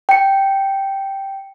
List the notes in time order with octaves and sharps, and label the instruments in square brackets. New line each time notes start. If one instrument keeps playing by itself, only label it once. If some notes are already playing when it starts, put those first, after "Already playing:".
[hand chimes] G5 C#7